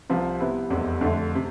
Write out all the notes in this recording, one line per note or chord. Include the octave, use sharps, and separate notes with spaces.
C2 C3 F3
C3 G3 B3 E4
F1 E2 C3 G3
F2 D3 A3
C3